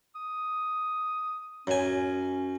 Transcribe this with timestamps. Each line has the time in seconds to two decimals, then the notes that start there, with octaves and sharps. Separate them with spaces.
0.15 D#6
1.67 F#2 C#4 G#5